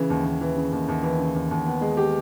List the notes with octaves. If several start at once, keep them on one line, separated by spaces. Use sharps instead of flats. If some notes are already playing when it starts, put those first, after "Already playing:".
Already playing: C#3 E3
D#2
D#2
E3
C#3
D#2
D#2
E3
C#3
D#2
D#2
B3
G#3
G4